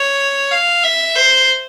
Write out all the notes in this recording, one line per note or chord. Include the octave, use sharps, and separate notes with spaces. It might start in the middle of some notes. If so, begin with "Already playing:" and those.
Already playing: C#5
F5
E5
C5